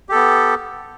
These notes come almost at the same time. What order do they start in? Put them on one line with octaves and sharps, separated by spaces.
G4 A4 B3